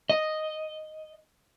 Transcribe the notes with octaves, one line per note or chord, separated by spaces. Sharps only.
D#5